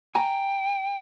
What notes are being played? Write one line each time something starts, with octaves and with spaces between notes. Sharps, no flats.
G5 G#5 A#5